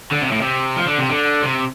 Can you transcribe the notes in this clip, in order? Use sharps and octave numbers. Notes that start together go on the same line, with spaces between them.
D3
C3
A2
C3
F3
D3
C3
D3
C3